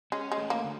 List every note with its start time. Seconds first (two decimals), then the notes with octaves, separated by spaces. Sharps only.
0.12 G#3 C#4
0.32 G#3
0.38 A3
0.50 A#3
0.64 D3